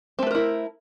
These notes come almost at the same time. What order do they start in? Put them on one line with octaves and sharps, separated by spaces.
C4 A3 B4 A#4 E4